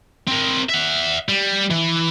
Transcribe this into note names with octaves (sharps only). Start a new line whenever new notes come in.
C4 A#4
E5 F#5
G3
E3